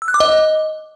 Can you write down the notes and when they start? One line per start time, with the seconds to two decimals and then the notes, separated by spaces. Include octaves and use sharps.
0.02 E6
0.08 F#6
0.14 D6
0.20 D#5